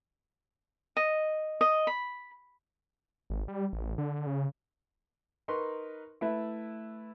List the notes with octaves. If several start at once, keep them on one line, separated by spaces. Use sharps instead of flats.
D#5
D#5
B5
G#1
G3
A1
D3
C#3
D#4 A#4 B4 C6 C#6
A3 E4 B4 E5